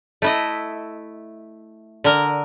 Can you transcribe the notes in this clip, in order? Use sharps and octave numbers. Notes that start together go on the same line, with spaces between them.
A3 E4 D#5
D3 A#4